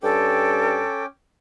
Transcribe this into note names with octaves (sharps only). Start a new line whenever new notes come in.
G2 C#4 A4 G5 D6